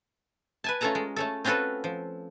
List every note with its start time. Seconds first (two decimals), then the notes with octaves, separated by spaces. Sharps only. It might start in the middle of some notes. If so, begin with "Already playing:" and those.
0.64 B4 G#5 A5
0.81 A3 C#4 F4 A4 A5 A#5
0.95 G#3
1.16 A3 C#4 A4
1.44 C4 C#4 F4 F#4 A4 B4
1.84 F3